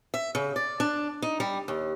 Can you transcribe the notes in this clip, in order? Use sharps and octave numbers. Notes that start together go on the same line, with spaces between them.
E5
C#3
D5
D4
D#4
G3
D#2